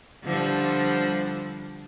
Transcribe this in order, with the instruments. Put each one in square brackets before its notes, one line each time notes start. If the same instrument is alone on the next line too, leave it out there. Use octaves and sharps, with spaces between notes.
[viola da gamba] D3 F3 G3